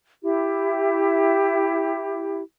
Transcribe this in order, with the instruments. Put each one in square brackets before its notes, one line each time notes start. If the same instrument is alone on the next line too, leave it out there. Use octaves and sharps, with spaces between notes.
[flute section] E4 G4